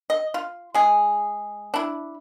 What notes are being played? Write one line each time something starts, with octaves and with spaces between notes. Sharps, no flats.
D#5
F4
G#3 G#4
D4 E4